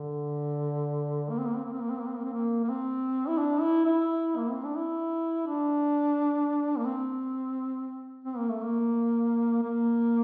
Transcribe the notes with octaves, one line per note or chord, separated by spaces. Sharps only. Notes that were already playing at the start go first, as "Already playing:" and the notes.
Already playing: D3
A#3
C4
A#3
C4
A#3
C4
A#3
C4
A#3
C4
A#3
C4
A#3
A#3
C4
E4
D4
E4
E4
A#3
C4
D4
E4
D4
A#3
C4
C4
A#3
A3
A#3
A#3